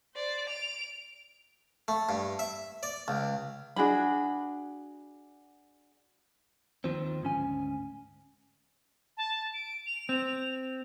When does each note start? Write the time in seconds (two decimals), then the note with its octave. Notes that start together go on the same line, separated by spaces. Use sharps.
0.15 C5 D5
0.48 D7 F7
1.88 A3
2.09 G2
2.39 E5
2.83 D5
3.08 C#2
3.76 D4 F#4 G#4 B5
6.84 D#2 D#3 F3 C4
7.22 D2 G#2 C#4 G#5
9.17 A5
9.54 D7
9.86 F7
10.09 C4